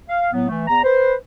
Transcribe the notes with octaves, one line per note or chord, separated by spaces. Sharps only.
F5
A2 F#3 B3
E3 A3
E2 A#5
B4 C5